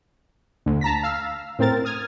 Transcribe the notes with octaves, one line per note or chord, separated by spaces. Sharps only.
D2
A5 A#5 A#6 B6
F5 E6
A2 C4 A#4 A6
D#6 F6 G#6